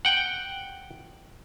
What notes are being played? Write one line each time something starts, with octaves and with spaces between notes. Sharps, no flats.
F#5 G5